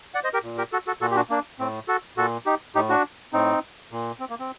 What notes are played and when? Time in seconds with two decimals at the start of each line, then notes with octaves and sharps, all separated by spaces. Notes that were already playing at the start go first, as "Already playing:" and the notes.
0.14 D5 F#5
0.23 C5 D#5
0.33 G4 A#4
0.43 A#2
0.58 G4 A#4
0.72 F#4 A4
0.87 F#4 A4
1.01 A#2 F#4 A4
1.11 G4
1.16 D4 F#4
1.30 A#3 D4
1.59 A2 C4
1.88 F#4 A4
2.17 A#2 F#4 A4
2.46 D#4 G4
2.75 A2 D#4 G4
2.89 D4 F#4
3.33 A2 C4 D#4
3.92 A#2
4.20 C4
4.30 A#3
4.40 C4